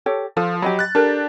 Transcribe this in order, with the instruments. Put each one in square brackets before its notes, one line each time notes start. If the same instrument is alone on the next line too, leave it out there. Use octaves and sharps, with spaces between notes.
[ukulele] G4 A4 C#5
[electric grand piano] F3 [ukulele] F4 A4 C5
[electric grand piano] F#3 [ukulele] G4 D#5 B5
[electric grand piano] F#6 A6
[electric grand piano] D4 G4 [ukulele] A4 A#4 D5